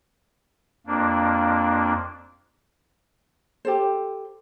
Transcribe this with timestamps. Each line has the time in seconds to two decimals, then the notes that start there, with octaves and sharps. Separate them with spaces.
0.87 F2 A#3 D4
3.65 G4 A4 C5